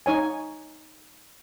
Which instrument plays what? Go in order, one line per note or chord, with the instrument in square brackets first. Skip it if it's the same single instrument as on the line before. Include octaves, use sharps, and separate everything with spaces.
[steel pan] D#4 C#5 G#5